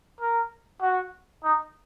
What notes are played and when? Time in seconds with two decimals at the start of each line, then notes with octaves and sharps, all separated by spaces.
0.21 A#4
0.82 F#4
1.44 D#4